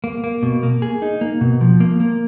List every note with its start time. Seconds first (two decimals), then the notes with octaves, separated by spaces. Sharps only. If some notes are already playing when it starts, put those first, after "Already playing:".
0.04 A#3
0.24 A#3
0.43 B2
0.63 A#3
0.82 G#4
1.02 D#4
1.21 A#3
1.41 B2
1.61 F3
1.80 A#3
2.00 A#3